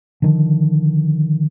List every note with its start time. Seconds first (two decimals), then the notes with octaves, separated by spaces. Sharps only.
0.22 D3 D#3 F3